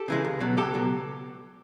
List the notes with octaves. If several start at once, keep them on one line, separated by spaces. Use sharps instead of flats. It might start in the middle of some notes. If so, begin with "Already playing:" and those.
Already playing: G4 A4
C#3 E3 G#3
C#2
B2 F#3
C#2 G4 A4
B2 F#3